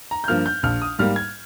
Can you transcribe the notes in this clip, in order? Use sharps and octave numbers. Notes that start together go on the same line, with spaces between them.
A#5
G6
G2 F3 A#3 F6
G6
A#1 F6
D#6
G#2 G3 A#3 F6
G#6